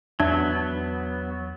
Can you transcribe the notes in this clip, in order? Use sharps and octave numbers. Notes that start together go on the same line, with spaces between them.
E2 F#3 B3 D4 E5 G#6